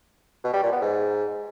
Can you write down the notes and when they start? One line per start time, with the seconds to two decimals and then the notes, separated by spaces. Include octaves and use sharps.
0.44 B2
0.54 G3
0.63 A#2
0.72 B3
0.82 G#2